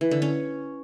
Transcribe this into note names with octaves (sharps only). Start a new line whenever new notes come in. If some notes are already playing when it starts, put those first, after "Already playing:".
E3
D3
C#4